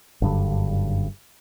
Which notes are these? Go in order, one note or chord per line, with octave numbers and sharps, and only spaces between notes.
F#1 G2 D3